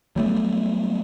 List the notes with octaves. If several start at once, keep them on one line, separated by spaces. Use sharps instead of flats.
F#3 G3 A3 B3